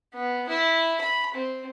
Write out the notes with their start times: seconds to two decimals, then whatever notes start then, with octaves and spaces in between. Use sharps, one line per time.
0.14 B3
0.49 E4
1.01 B5
1.34 C4